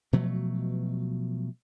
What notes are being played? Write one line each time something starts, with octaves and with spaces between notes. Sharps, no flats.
B2 F3 F#3 A3